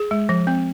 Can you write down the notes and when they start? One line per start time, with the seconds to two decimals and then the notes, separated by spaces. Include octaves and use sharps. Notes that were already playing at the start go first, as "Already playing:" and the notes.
Already playing: G#4
0.11 G#3
0.29 F3
0.47 C4